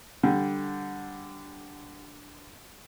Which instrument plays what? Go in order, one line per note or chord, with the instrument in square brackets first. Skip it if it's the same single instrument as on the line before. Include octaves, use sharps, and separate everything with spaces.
[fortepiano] D3 G3